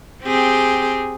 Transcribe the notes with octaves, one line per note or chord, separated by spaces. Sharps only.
C4 G4 G#4